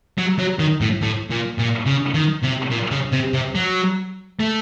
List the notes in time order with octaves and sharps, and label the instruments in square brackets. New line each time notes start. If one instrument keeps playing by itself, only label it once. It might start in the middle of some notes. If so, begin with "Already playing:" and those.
[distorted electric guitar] F#3
F#3
D#3
A2
A2
A#2
A#2
C#3
D#3
C3
A#2
C#3
C3
C3
F#3
A3